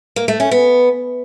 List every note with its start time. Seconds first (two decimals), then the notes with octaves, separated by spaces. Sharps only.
0.16 A#3
0.28 A3
0.40 C#4
0.51 B3